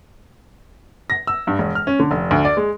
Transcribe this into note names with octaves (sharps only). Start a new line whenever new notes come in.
A#6
E6
G2
E1
F6
C#4
D3
F1
D2
D5
G#3